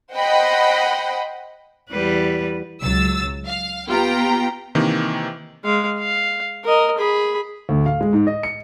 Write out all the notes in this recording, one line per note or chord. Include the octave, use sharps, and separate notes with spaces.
C5 D#5 F#5 G5 B5
E2 G3 B4
C#2 F#3 E6 A6
F5
B3 F4 G4 G5 A#5
C3 D#3 E3 A#3
G#3 F5
F5
A#4 D#5
G#4 B5
D2
F5
G#3
G#2
D#5
C#7